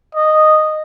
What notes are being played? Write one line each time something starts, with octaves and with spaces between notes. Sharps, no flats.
D#5